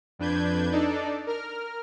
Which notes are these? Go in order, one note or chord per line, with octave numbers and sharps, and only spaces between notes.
F2 D4 B4 G6 G#6
D4 D#4 A4 D5
A#4 F6